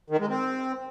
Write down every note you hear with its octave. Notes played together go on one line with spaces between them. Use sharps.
D#3
G#3
C4